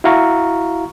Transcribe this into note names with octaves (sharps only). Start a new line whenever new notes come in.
E4 F#4 F5 A#5 C#6